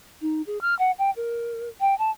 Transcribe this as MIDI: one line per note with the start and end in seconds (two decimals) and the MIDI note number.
0.21 0.42 63
0.47 0.58 68
0.61 0.75 89
0.79 0.91 78
0.99 1.10 79
1.16 1.69 70
1.80 1.97 79
1.99 2.11 81